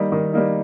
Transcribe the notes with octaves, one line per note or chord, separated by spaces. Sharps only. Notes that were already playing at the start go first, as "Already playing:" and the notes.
Already playing: D#3 G3 A#3 D#4
D#3
G3 A#3 D#4